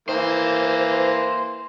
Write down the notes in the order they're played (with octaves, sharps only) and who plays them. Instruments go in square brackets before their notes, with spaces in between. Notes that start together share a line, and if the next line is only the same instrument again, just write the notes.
[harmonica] E3 A#3 [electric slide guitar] C5